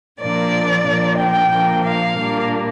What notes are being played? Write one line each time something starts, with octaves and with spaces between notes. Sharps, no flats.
A#2 F3 A#3 D4 D5
A#2 F3 A#3 D4
G5
A#2 F3 A#3 D4
F5
A#2 G3 A#3 D4